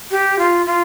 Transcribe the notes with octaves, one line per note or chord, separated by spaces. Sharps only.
G4
F4
F4